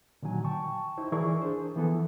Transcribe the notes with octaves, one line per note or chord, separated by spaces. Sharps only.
A#2 D3 D#3 F#3 G#5
G5 A5 C#6
D#4 E4 C5
E3 E4 G#4 A#4 D5 C#6
D4 G#4 C5
E3 F3 B3 A4